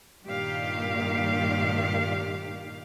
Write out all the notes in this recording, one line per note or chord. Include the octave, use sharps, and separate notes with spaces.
G2 A#2 D#3 G4 F5